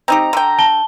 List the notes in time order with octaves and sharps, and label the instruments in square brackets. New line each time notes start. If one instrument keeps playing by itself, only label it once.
[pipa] C4 D#4 G4 [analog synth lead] A#5
[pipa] D3 G5
[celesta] A5 G7